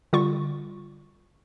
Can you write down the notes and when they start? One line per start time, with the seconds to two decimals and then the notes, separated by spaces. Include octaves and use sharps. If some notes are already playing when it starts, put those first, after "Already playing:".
0.13 D3 G3 F4 C#6